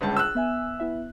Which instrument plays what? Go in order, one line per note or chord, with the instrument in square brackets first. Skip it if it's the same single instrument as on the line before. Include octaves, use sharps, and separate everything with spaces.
[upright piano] G1 C#2 A5
E6 F#6
[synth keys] B3 E5 G#5
B3 E4 E5